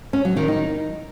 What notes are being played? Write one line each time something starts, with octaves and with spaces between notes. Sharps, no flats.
C#4
F#3
D#3
D#4